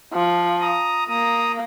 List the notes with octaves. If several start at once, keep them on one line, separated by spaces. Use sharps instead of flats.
F3
A#5 D#6
A#3 A#5 D#6